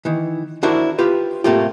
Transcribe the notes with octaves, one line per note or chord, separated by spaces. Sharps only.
D#3 E3
D4 E4 F#4 A#4 C5 D5
F4 G4 B4
A2 C3 A3 A#3 F4 G4